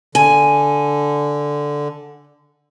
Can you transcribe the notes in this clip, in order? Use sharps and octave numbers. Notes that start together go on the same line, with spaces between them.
D3 G#5